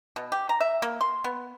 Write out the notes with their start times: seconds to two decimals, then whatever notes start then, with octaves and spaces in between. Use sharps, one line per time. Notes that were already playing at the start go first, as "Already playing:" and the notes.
0.16 B2
0.32 G4
0.49 A#5
0.60 E5
0.82 A#3
1.01 C6
1.24 B3